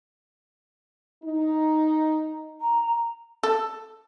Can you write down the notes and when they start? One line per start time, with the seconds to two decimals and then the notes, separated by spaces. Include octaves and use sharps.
1.24 D#4
2.60 A#5
3.43 A4